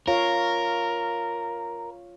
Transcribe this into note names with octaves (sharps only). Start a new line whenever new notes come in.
F4 A#4 C#5 F5